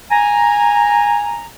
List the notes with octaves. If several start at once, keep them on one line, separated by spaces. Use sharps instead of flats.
G#5 A#5